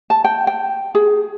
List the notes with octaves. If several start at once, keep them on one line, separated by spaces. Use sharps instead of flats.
A5
G5
G5
G#4